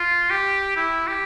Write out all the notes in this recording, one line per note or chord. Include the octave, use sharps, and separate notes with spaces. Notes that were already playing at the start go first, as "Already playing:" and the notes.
Already playing: F4
G4
E4
G4